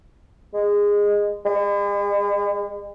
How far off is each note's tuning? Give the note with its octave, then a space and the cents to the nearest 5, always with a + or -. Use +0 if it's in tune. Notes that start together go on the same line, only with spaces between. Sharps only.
G#3 -15
G#3 -45